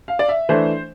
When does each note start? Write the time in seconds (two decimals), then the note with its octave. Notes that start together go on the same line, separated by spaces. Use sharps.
0.08 F5
0.19 D5
0.29 E5
0.49 E3 A3 D4 C5